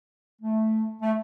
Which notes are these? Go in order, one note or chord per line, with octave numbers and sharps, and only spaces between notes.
A3
A3